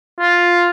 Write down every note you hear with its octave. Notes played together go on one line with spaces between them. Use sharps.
F4